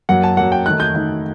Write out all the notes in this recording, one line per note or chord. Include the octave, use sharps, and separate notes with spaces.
F#2 F#3 A#3 F#5
A5
F#2 F#3 A#3 F#5
G5
D#3 A3 D#4 F#6
G6
D#3 A3 D#4